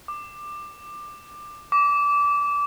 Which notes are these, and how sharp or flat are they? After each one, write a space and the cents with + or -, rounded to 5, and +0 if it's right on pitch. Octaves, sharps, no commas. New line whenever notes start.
D6 +20
D6 -25